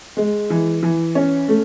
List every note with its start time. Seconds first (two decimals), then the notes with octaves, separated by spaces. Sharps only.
0.17 G#3
0.50 E3
0.83 E3
1.15 C#4
1.48 A3